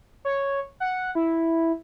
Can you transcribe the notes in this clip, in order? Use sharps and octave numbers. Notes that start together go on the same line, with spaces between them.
C#5
F#5
E4